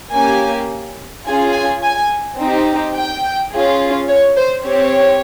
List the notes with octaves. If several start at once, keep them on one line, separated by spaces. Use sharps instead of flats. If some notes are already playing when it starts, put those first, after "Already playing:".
A#3 C#4 G4 G#5
C#4 F4 G#4 G#5
G#5
G#5
C4 D#4 G4
G5
C#4 F4 G#4
C#5
C5
C4 G4 C#5